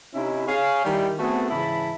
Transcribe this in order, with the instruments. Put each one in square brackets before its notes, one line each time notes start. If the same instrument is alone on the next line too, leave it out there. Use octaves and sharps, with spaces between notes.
[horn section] C3 C#4 D#4 E4
G#4 C#5 F5
D#3 G3 E4
A3 B3 C4 F#4 G#4 A4
G#2 C#3 E3 E4 A5 B5